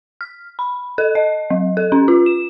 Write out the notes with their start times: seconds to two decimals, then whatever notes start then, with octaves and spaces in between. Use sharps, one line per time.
0.21 F6
0.59 B5
0.98 A4
1.15 D#5
1.50 F#3
1.77 A4
1.92 C#4
2.08 F4
2.26 E7